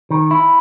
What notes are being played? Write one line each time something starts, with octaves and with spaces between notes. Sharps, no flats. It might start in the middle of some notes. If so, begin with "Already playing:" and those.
D#3
E4